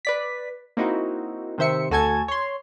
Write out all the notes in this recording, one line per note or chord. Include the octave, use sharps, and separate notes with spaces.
B4 D5 B6
A#3 C4 D#4 E4 F#4
C3 D#3 C5 E5 C#7
D2 F#4 A4 G#5 A5 G#6
C#5 C6